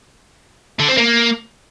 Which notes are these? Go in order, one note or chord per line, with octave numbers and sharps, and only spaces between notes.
D3
C4
A#3